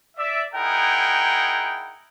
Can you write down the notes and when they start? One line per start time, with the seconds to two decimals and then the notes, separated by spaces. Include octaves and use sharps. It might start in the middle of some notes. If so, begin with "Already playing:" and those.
0.17 D5 E5
0.54 D#4 E4 G#4 A#4 F#5 G5